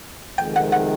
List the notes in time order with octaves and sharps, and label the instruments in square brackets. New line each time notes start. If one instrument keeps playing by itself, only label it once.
[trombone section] F2 C3 D#3 G#3 [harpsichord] G5
[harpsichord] F#5
F#5